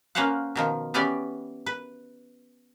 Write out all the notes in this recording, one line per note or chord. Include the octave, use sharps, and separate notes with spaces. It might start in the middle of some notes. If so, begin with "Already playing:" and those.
A#3 C#4 B4 C5 F5 F#5
B2 D#3 F3
E3 B3 C#4 G4 D5
B4